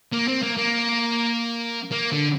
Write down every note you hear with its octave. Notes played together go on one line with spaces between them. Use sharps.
A#3
C4
A#3
A#3
A#3
D3